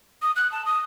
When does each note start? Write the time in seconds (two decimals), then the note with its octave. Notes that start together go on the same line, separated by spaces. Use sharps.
0.22 D#6
0.36 F#6
0.52 A5
0.65 D#6